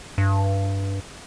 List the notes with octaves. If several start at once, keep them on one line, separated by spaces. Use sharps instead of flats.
G2